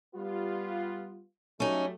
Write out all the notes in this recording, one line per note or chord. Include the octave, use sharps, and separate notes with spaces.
G3 B3 F4
F#3 G3 A3 C#4 D#4